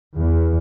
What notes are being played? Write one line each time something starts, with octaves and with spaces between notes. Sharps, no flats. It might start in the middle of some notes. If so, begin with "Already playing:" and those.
E2